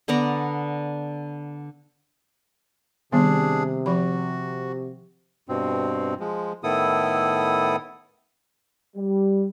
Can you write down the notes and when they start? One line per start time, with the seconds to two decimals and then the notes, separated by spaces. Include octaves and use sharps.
0.08 D3 B3 D5 A#5
3.12 C3 D#3 G3 B3 D4 G#4
3.86 F3 F#4 B5
5.49 G2 B2 C4
6.20 F3 G#3
6.64 A2 D#3 B3 E4 A4 D#6
8.96 G3